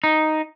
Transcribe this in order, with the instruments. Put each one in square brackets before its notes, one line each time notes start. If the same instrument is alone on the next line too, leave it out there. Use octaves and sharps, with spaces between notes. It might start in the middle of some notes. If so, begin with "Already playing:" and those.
[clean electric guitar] D#4